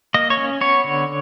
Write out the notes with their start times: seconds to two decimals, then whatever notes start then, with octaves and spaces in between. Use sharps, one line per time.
0.14 A#3 D#5
0.30 C#5
0.37 C#4
0.61 B3 C#5
0.84 D3